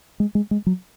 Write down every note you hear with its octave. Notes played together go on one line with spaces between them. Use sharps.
G#3
G#3
G#3
F#3